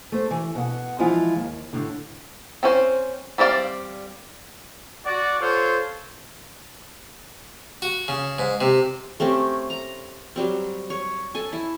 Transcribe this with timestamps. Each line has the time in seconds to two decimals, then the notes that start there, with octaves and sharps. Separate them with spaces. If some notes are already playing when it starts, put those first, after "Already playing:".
0.12 A3 C5
0.31 E3
0.55 B2 F#5
0.99 E3 F3 G#3 E4 F4
1.35 D#2
1.73 A2 D3
2.63 C4 C#4 C5
3.38 G3 C4 D4 D5 F5
5.06 F#4 D5
5.41 F4 A4 C5 C#5
7.82 F#4
8.08 C#3
8.39 G#2
8.61 C3
9.20 A3 C4 C#4 G4
9.70 A#5
10.36 F#3 G3 C4
10.90 C#5
11.35 A4 G#5
11.53 E4